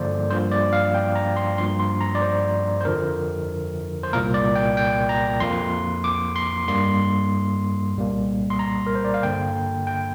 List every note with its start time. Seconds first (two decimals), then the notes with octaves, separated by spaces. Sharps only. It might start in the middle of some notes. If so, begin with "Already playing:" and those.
Already playing: G2 D3 F3 A#3 C5 D5
0.30 G2 F3 A#3 C5
0.51 D5
0.73 F5
0.95 G5
1.15 A#5
1.36 C6
1.58 G2 F3 A#3 C6
1.79 C6
2.01 A#5
2.15 D5
2.22 C5
2.81 C5
2.85 F2 D3 F3 A#4
4.03 C5
4.13 C2 A#2 A#3 A#4
4.34 D5
4.55 G5
4.77 G5
5.09 A#5
5.40 F2 F3 A#3 C6
6.04 D6
6.36 C6
6.68 G2 G3 A#3 C6
7.96 C2 A#2 G3 A#3
8.50 C6
8.59 A#5
8.86 A#4
8.95 C5
9.04 D5
9.14 F5
9.23 G2 D3 A#3 G5
9.87 G5